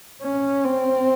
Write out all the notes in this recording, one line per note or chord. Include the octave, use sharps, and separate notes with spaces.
C#4
C4